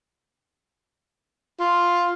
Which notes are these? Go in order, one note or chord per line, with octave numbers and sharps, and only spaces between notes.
F4